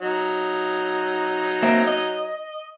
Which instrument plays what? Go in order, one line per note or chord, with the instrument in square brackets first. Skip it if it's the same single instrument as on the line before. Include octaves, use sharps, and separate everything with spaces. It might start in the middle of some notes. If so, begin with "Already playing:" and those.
[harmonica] F#3 D#4
[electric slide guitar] A#3 C4 E5
D#5